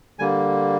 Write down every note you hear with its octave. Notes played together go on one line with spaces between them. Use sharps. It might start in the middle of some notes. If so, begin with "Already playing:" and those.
D3 G3 A#3 G#5